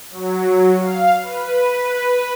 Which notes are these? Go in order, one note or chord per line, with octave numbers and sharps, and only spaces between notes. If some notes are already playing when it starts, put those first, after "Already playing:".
F#3
F5
B4